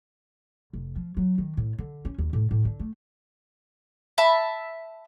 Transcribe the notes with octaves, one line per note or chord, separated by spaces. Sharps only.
F1
F3
F#3
D#3
A2
D3
C#4
D#2
A2
A2
D3
A3
E5 A5 B5